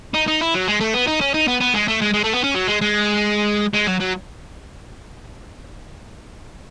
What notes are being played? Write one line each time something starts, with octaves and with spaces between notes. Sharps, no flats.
D#4
D#4
E4
F#3
G#3
A3
B3
D#4
C#4
D#4
B3
B3
G#3
A3
G#3
G#3
A3
B3
C#4
F#3
G#3
G#3
G#3
F#3
F#3